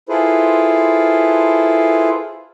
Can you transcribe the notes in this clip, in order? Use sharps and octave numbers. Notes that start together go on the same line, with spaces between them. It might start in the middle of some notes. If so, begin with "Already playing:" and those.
E4 F4 G#4 A4 B4 C5